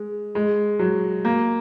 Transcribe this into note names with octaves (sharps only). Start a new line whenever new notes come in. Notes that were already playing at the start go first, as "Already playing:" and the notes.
Already playing: G#3
G#3
F#3
A#3